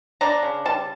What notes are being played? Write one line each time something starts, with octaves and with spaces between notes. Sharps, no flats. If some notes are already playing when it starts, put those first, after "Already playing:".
D4 A#5
C#3
G3 A5